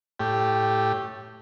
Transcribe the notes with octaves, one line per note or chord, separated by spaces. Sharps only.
A2 G4